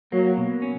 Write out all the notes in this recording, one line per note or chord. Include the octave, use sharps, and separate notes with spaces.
F#3 A#3
B2
C#4